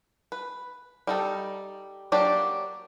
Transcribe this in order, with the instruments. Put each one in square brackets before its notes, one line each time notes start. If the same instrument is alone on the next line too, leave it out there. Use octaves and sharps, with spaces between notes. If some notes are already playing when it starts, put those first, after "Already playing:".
[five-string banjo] B4
G3 D#4 A4
F#3 A#3 D4 G4 D5